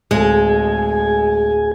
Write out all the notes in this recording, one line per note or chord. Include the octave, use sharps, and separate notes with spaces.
D1 G#3 G#4 A4 G#5